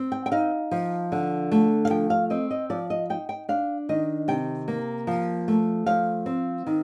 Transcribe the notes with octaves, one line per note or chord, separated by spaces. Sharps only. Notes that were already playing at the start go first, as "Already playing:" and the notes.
Already playing: C4
G5
G5
D#4 F5
F3
D3
A3
F5
F3 G5
F5
C4 D#5
D#5
F3 D5
D#5
D#4 G5
G5
D4 F5
D#3 D#5
C3 G5
A#3
F3
A3
F3 F5
C4
D#3